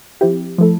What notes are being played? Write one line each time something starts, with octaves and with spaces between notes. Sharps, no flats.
F3 C4 E4 G4
F3 A3 E4 A4